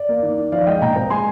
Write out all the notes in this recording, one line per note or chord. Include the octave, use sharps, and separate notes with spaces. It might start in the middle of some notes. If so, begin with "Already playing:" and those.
Already playing: D5
A#3
D#3
D#3
F3 D5 F5
G#3 D#5 G5
A#2 G5 A#5
C4
G#3 G#5 C6